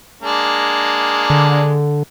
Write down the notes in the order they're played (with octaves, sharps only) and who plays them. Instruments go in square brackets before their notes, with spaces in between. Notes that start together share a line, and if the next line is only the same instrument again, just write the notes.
[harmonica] G#3 A#3 D4
[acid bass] D3